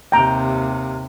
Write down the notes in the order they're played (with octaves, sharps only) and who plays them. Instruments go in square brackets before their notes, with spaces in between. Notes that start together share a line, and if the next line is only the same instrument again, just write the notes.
[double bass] D#2 C3 [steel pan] G5 A#5